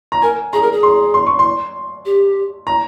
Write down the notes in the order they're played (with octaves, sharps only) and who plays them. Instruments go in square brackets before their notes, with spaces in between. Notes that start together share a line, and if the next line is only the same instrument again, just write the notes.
[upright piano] A#5
[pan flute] A#4 [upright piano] G#5
[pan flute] G#4 [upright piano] A#5
[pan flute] A#4
G#4
[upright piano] C6
C6
C#6
C6
[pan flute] G4
[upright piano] A#5